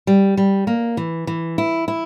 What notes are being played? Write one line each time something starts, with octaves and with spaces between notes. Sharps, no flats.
G3
G3
A#3
E3
E3
E4
E4